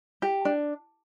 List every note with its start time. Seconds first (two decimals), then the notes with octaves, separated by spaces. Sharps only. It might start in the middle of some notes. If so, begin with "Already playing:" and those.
0.22 G4
0.45 D4